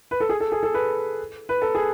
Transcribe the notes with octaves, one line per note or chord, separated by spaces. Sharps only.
B4
A4
G#4
A4
G#4
A4
B4
B4
A4
G#4